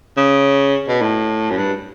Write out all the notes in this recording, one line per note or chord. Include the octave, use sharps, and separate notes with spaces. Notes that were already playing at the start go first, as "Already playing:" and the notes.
C#3
B2
A2
F#2
G2